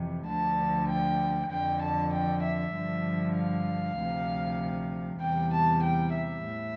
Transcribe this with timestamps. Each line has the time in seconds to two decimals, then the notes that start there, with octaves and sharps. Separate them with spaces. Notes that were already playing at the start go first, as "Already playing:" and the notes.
Already playing: F2 C3 E3
0.27 D2 D3 F3 A5
0.88 G5
1.50 F2 D3 F3 G5
1.81 A5
2.13 G5
2.43 E5
2.74 G2 D3 F3
3.36 F5
3.97 D2 C3 F3
5.21 E2 C3 E3 G3 G5
5.53 A5
5.82 G5
6.14 E5
6.44 A2